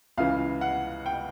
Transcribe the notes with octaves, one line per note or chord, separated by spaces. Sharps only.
C#2 C#3 E3 F5
F#5
G5